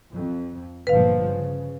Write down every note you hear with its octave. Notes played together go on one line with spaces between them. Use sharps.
F2
G1 A#2 F3 B4 F5
C#3